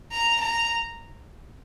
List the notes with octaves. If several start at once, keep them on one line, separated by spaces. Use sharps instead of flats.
A#5
A#5